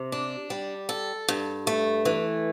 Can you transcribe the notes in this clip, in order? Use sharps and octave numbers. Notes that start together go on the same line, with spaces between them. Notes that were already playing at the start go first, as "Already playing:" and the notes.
Already playing: C3
D4
G3
A4
G2
A3
E3